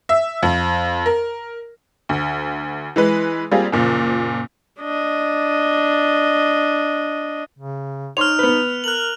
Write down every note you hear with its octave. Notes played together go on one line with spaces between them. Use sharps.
E5
F2
A#4
D2
E3 G#3 B4
G3 A#3 C4 F4 G#4
F#1 A#2 F3
D4 D#5
C#3
D#4 C#5 C6 F6 F7
B3 B4
A#4 F#6 F#7